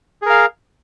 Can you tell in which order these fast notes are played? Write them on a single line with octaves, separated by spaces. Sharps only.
G#4 A#4 F5